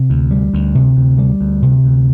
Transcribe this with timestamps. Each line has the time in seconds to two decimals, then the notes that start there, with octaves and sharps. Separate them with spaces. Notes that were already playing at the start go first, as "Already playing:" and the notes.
Already playing: C3
0.10 D2
0.31 G3
0.54 D2
0.75 C3
0.97 D2
1.18 G3
1.41 D2
1.62 C3
1.84 D2